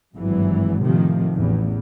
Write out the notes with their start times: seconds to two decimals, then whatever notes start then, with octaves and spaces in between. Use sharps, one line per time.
0.15 G#1 G2 E3 F#3
0.80 A2 C3 D#3 F3
1.35 A1 E2